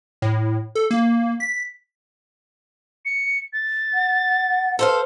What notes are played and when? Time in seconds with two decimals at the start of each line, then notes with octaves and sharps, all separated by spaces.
0.22 A2
0.75 A4
0.91 A#3
1.40 B6
3.05 C#7
3.53 A6
3.94 F#5
4.79 A4 B4 C5 F5